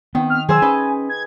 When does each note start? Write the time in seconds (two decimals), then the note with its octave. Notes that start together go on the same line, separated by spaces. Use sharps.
0.15 D#3 B3 C4
0.30 F6
0.49 D#3 F#3 G#4 C5 G#5 E6
0.62 C#4 D#4 B4 D#5
1.09 G#6